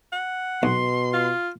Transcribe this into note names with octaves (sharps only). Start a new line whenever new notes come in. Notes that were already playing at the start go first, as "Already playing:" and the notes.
F#5
B1 B2 C6
F4